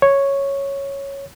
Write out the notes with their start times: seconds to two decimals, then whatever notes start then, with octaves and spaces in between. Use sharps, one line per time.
0.02 C#5